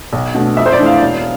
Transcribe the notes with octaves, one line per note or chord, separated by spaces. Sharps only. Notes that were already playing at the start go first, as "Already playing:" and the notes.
B1
B2 A3 D4
F2 E5
C5
D5
E3 A3 D4
F5
E1